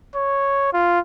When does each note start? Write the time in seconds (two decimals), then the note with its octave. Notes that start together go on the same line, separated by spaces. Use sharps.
0.16 C#5
0.73 F4